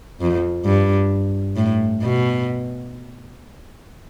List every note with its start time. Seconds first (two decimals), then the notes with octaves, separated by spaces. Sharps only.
0.21 F2
0.65 G2
1.56 A2
2.02 B2